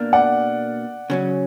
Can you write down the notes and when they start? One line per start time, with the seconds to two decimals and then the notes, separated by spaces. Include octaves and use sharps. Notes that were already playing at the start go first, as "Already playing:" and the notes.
Already playing: B2 A#3 D4
0.13 D5 F#5
1.10 C#3 F#3 C#4